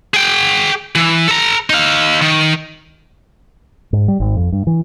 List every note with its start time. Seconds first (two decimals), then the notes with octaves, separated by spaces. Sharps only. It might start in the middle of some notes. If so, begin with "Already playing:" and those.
0.14 G#4 G5
0.95 E3
1.28 A4 A#5
1.70 D#4 F5
2.22 D#3
3.93 G#2
4.08 G3
4.20 G#1
4.36 F2
4.52 G2
4.67 E3